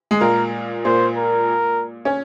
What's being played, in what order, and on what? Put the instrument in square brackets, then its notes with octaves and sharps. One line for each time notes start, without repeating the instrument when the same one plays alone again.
[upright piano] G#3
[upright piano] A#2 A#3 [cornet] A#4
[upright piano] A#2 A#3 [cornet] C5
[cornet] A#4
[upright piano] C#4